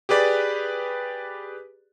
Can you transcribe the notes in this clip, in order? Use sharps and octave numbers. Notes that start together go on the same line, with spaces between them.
G4 G#4 B4 D5